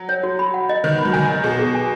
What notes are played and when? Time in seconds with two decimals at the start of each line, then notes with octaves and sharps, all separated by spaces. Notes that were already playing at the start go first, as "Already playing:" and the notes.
Already playing: F#3
0.09 C#5
0.23 F#4
0.39 B5
0.54 F#5
0.69 D#5
0.84 D#3 B4
0.98 B5
1.05 F#3
1.13 D#3 G#5
1.30 D#5
1.44 B2 G#4
1.58 G#4
1.75 G#5